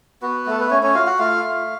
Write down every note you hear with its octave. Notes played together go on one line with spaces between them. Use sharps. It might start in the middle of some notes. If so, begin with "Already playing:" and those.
B3 F#4 B4
A3 A4
B4
A3 C#4 C#5
C#4 C#5
F4 F#4 F5
F#4 F#5
A3 F4 F5
F4